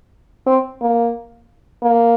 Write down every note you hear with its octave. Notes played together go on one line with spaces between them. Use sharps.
C4
A#3
A#3